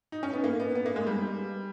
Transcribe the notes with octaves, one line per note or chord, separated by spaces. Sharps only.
D#4
C#4
B3
A#3
B3
B3
A#3
G#3
G3